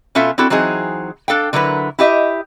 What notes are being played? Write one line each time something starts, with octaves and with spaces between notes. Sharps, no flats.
B2 C#4 F4 A4 E5
C4 D4 E4 F#4 A4
E3 F#3 C4 D#4 G#4
D4 A4 F5 G5
D3 F#3 E4 A#4 B4
E4 G4 D#5 E5